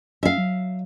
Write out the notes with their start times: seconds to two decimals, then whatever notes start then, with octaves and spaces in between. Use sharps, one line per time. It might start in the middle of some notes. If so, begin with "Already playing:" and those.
0.23 C#4 E5 F5
0.38 F#3